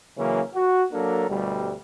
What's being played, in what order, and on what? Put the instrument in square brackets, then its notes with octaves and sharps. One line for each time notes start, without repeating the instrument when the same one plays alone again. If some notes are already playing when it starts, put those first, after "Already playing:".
[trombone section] C#3 E3 F#3 A#3 C#4
F#4
F#3 A#3 D4 A4 A#4
D2 B2 G3